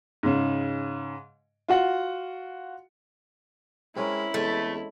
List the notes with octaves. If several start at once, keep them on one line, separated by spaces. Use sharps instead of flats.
G#2 C#3
F4 F#4 F#5
G#3 C4 C#4 E4 A#4
E2 G#3 A3